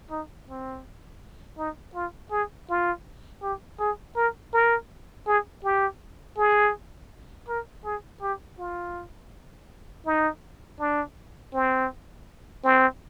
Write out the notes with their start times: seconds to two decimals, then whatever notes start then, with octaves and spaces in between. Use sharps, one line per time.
0.10 D#4
0.48 C4
1.58 D#4
1.95 F4
2.31 G#4
2.69 F4
3.42 G4
3.80 G#4
4.16 A#4
4.53 A#4
5.26 G#4
5.64 G4
6.38 G#4
7.48 A#4
7.85 G#4
8.22 G4
8.59 F4
10.06 D#4
10.80 D4
11.54 C4
12.64 C4